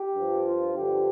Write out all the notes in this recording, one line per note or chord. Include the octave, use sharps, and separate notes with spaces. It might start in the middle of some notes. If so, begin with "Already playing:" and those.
Already playing: G4
G2 F3
F4
G2 D3 F3 G4